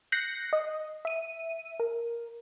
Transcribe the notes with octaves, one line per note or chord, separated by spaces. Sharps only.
F#6 G6 A#6 C7 C#7
D#5
E5 D#7
A#4